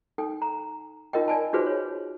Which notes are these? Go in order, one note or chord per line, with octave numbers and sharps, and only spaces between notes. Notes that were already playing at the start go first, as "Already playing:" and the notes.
D#4 A4 G5
A#5
D#4 F4 A#4 D#5 G5
D5 G#5 A5
D#4 F4 F#4 G#4 B4 C5
C#5